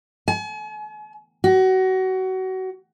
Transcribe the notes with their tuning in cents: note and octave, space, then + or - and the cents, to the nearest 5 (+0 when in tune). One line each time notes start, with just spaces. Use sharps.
G#5 +45
F#4 +25